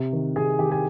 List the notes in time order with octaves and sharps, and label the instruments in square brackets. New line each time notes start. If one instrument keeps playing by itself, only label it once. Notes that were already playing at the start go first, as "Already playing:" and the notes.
Already playing: [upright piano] C3
D#3
C3 G#4 G#5
D#3 G4 G5
G#4 G#5